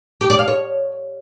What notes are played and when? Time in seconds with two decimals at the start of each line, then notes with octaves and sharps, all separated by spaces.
0.21 G4
0.30 D5
0.39 F5
0.48 C#5